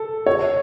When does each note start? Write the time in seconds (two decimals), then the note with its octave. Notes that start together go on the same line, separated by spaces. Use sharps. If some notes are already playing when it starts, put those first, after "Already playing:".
Already playing: A4
0.26 C#5